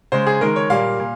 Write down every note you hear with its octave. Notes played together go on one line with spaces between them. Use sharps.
C#3 G#3 C5
G#4
D#3 G#3 A#4
C#5
A#2 G3 A#3 F5
A#2